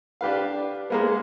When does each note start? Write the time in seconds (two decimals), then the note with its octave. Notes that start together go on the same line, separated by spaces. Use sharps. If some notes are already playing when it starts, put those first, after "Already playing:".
0.21 D4 G4 B4 F5
0.90 G#3 A#3 B3